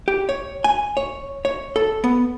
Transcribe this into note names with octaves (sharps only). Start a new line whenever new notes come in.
G4
C#5
G#5
C#5
C#5
A4
B3